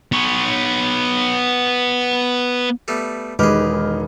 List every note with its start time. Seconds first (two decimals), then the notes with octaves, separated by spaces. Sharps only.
0.12 B3 C#5
2.88 G3 A3 B3
3.39 E1 D#3 G#3 D#4 G4 G#4 B4 F6